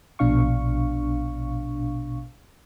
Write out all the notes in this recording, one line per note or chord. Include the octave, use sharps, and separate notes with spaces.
A#1 B2 D4 F5 C#6